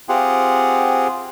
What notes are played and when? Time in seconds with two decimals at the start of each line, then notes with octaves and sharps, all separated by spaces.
0.09 C4 F4 G4 G#4 F#5